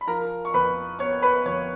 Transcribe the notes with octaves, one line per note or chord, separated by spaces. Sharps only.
B5
F3 A#4 A#5
C#6
F2 B4 B5
B3 C#5 C#6
B4 B5
F2 C#5 C#6